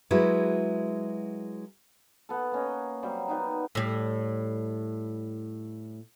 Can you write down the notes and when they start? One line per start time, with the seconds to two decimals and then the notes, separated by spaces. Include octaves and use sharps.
0.11 F#3 G#3 E4 F#4 B4
2.29 B3 A4
2.52 A#3 C#4 D#5
3.02 F#3 G3 A#3 C4
3.28 G3 B3 D#4
3.75 A2 G3